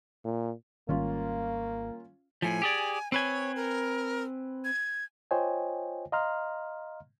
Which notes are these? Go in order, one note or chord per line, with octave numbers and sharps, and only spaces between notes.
A#2
G#1 D#3 G3 G#3 A#3 C#4 F4
A2 F3 G#5
G4 G#4 D5
C4 B4 C#5 G#5
A#4
G#6
F4 C5 C#5 D#5 G5 G#5
D#5 F5 A#5 C6 F6